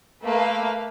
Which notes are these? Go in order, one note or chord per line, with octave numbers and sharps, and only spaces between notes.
A3 A#3 B4 F5